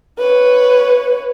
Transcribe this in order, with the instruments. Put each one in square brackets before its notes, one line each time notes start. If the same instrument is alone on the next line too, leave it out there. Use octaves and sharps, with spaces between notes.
[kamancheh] B4 C#5